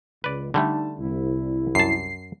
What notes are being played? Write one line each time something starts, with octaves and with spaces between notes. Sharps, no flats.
C#2 B4 D5
D3 G3 A3 D#4 A5
C2 E4
F#2 A5 C7